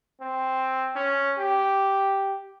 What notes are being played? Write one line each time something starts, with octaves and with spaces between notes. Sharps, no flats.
C4
C#4
G4